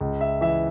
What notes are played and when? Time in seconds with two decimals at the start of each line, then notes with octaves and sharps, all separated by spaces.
0.01 C#2
0.21 E5
0.41 E3 E5